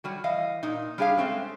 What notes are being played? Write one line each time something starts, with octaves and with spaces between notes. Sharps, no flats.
F#3 G3 F#4
E3 D#5 F5
A#2 D#4
G3 D4 G4 G#4 E5 F5
G#3 A3 C4 C#4